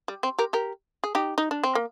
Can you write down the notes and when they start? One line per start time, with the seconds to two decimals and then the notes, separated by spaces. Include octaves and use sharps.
0.08 G3
0.23 C4
0.39 G4 A#4
0.53 G4 A#4
1.04 G#4
1.15 D#4 G4
1.38 D#4
1.51 D4
1.64 C4
1.75 A#3